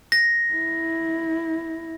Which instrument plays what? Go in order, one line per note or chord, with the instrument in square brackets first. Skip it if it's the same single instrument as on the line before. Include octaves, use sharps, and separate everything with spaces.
[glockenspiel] A#6
[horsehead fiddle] E4